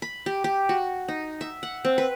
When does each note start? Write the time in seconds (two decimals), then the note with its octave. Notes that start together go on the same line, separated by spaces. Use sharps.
0.02 B5
0.26 G4
0.44 G4
0.69 F#4
1.08 D#4
1.41 E5
1.63 F#5
1.85 C4
1.98 B4